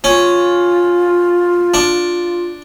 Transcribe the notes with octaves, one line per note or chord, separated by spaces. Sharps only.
C#4 F4
D4